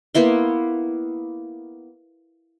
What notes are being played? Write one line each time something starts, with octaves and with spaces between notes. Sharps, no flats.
A#3 B3 E4 C6